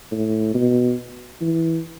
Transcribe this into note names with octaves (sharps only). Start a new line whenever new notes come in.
A2
B2
E3